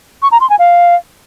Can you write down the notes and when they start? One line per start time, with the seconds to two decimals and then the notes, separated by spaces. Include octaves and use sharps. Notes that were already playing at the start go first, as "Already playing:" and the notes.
0.22 C#6
0.32 A#5
0.41 C6
0.50 G#5
0.59 F5